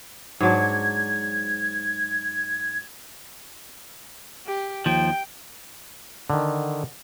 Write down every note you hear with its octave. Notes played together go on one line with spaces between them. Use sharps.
G#2 F#3 D4 G#6
G4
D#2 F3 G5
D3 D#3